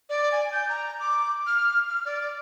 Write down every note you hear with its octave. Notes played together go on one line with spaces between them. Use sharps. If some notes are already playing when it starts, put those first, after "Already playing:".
D5
G#5
G6
A#5
D6
F6
F6
D5